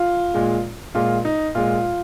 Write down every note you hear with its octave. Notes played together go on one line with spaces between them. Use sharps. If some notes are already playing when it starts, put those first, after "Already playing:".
Already playing: F4
A#2 G#3
A#2 G#3 F4
D#4
A#2 G#3 F4